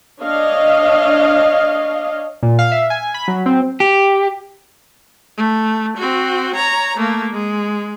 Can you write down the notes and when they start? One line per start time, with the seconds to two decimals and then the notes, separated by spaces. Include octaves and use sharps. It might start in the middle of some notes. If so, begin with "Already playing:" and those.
0.20 D4 C#5 D#5 F5
2.43 A#2
2.59 F5
2.72 E5
2.90 G#5
3.14 B5
3.28 F#3
3.46 C4
3.80 G4
5.37 A3
5.97 C4 F#4
6.55 C#5 A#5
6.97 A3 A#3
7.33 G#3